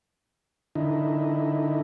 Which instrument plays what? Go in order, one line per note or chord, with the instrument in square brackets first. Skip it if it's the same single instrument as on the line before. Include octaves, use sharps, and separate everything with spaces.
[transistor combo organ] D3 D#4 E4